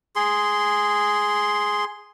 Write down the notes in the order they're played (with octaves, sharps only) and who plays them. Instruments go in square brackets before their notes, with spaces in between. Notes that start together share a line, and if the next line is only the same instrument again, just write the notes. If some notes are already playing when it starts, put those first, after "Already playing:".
[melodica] G#4 C6